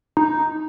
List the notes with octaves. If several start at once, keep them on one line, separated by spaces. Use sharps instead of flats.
D#4